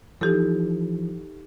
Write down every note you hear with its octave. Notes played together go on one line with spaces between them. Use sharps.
E3 F3 D#4 G4 A4